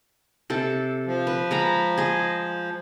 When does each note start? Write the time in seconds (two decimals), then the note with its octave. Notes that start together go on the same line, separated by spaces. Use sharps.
0.50 C3 A4 A5
1.06 F3
1.27 B4
1.51 G#3 A#5 B5
1.97 G#4 D#5